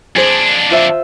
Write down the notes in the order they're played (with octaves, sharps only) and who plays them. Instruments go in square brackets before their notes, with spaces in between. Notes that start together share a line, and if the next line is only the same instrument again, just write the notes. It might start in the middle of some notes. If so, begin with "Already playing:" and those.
[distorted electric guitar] F2 D4 [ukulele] G#4 C5
[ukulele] F4 C5 E5